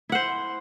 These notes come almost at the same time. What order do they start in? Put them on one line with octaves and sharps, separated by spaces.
E4 F#5 C5